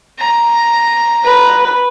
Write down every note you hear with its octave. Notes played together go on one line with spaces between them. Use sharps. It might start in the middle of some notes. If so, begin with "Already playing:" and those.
A#5
B4